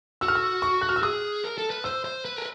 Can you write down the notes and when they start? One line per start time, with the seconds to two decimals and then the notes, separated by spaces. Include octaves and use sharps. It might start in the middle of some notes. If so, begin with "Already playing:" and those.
0.21 F#4 E6
0.28 F6
0.35 E6
0.62 C#6
0.81 F#6
0.89 F6
0.96 E6
1.03 G#4 D#6
1.44 A#4
1.58 A4
1.70 B4
1.84 C5 E6
2.04 C5
2.25 B4
2.36 A#4